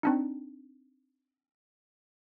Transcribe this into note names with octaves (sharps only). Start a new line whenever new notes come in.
C4 D4 D#4